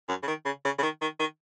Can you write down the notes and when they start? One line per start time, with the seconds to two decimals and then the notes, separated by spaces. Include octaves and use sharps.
0.09 F#2
0.23 C#3
0.28 D#3
0.45 C#3
0.65 C#3
0.78 C#3
0.83 D#3
1.01 D#3
1.19 D#3